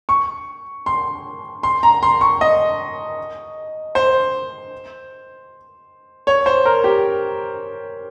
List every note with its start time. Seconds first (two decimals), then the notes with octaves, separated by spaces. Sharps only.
0.09 C#6
0.86 C6
1.63 C6
1.83 A#5
2.03 C6
2.21 C#6
2.41 D#5
3.95 C5
6.27 C#5
6.46 C5
6.65 A#4
6.84 G4